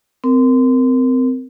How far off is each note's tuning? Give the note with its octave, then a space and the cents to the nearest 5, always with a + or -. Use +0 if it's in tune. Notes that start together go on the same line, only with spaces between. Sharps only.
C4 -25 A#4 -5